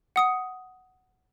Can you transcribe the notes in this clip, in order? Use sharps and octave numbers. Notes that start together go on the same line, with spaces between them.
F#5 D#6 C#7